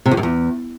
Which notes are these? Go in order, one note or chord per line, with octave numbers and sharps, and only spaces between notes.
C3
E2
F#2
E2